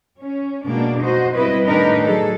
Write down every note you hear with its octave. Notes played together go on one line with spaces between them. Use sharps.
C#4
B2 G3 G#3 A#3 D4
D#4 F#4 C5 D#5
G3 C4 E4 B4 D#5
A2 D#3 D4 D#4 A#4 B4
F#3 G#4 A4